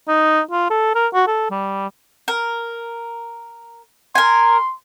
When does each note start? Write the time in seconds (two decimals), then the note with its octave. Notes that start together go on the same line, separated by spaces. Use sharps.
0.08 D#4
0.51 F4
0.70 A4
0.95 A#4
1.13 F#4
1.27 A4
1.50 G3
2.28 A#4
4.15 A#4 G#5 C6